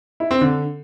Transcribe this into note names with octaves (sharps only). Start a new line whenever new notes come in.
E4
C4
D3